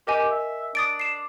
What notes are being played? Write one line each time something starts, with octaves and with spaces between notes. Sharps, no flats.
G4 A#4 D#5 G#5
E5
D4 D#6 A6 D7
C7 E7